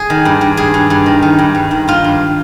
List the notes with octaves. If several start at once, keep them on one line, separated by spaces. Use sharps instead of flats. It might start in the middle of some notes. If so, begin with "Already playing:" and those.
Already playing: G#4
D#3
G2
G2
G2 G#4
G2
G2
D#3
D#3
G2
G2
D#3
D#3 F4
G2